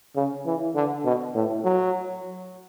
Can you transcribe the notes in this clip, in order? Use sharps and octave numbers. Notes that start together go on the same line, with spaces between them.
C#3
E3
D3
B2
A2
F#3